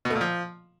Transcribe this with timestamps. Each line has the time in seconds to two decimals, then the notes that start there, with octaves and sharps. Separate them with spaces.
0.05 B2
0.10 A3
0.16 A#2
0.21 F3